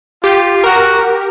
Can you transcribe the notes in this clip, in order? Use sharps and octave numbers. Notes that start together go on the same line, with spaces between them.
F4 G4
F#4 A#4